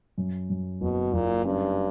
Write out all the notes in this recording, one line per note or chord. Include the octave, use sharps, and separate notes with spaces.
F#2
F#2
F#1 B2
F#1 A#2
G2 C#4